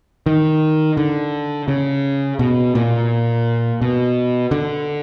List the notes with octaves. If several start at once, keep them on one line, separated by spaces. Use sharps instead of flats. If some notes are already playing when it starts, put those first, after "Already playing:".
D#3
D3
C#3
B2
A#2
B2
D3